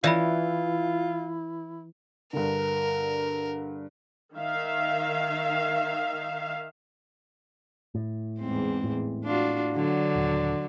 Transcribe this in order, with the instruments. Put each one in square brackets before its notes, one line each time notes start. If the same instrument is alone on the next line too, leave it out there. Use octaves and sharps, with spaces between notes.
[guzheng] E3 [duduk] E4 [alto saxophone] F4 [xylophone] D5 E5 B5
[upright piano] G2 D3 [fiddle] A#4
[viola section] D#3 E5 F5
[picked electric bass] A2
[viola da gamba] E2 G#2 C4
[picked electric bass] A2
[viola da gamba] D4 F4 F#4
D3 F#3
[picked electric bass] D#1